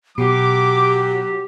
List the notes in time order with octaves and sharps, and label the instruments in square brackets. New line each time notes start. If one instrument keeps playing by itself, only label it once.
[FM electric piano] B2 [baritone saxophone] F#3 [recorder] G4 [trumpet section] D6